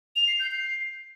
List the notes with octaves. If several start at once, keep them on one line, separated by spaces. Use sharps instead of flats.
F7
C7
G6
C7